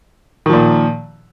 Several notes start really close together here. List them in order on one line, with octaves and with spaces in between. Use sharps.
D#3 F3 A#2